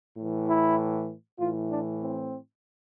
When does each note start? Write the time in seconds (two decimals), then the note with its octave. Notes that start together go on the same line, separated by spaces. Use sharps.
0.17 A2 E3
0.47 E4
1.39 A2 E3 F4
1.69 D4
2.00 C4